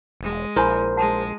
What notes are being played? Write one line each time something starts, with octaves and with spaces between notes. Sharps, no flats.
E1 G#3
A#1 E4 A#4 C5 G#5 B5
G#3 F#5 A5